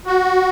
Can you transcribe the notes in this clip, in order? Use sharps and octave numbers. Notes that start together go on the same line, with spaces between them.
F#4